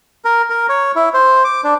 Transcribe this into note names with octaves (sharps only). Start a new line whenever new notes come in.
A#4
A#4
C#5
E4
C5
D6
D4